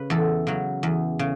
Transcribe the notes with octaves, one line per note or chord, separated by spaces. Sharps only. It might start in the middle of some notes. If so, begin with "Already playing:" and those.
Already playing: C#3 B4
E2 A4
C#3 F#3
E2
C#3